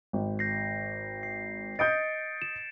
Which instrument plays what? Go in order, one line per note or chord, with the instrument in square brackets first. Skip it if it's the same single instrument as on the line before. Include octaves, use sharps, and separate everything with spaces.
[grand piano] G#1
[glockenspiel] G6 A#6 C7
C7
[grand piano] D#5 D#6 G6 [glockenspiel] A6 C#7 D7
[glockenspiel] E7